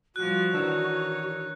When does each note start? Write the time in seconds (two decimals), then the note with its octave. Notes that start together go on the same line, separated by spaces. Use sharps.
0.16 F3 G3 F#4 F#6
0.54 D#3 E3 D4 C#5 E6